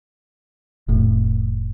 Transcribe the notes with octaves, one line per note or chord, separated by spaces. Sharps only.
F1 A2